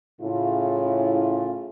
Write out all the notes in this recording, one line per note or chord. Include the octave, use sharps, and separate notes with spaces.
A2 C#3 E4 F4